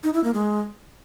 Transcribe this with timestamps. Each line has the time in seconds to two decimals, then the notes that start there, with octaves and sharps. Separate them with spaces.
0.03 D#4
0.14 E4
0.24 A#3
0.34 G#3